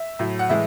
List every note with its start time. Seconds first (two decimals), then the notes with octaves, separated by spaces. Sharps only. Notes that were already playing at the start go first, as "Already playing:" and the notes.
Already playing: E5
0.19 A2 F#3
0.39 F#5
0.49 A2 E3 G#3 E5